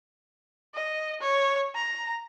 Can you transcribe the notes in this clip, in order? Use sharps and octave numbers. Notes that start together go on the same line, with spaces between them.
D#5
C#5
A#5